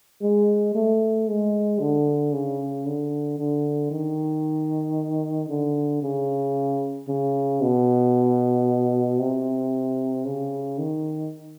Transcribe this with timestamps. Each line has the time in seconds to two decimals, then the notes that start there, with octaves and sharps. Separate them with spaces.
0.21 G#3
0.75 A3
1.28 G#3
1.80 D3
2.33 C#3
2.86 D3
3.38 D3
3.91 D#3
5.49 D3
6.02 C#3
7.08 C#3
7.61 B2
9.19 C3
10.25 C#3
10.78 D#3